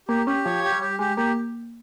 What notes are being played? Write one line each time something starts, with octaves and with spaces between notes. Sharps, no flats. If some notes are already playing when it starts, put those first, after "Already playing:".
A#3 G4
C#4 G4
F3 C#5
G4
G3
G4
G#3 G4
A#3 G4